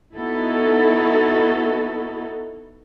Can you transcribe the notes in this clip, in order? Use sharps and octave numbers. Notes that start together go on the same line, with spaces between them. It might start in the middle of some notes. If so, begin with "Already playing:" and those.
B3 D#4 E4 F#4 A4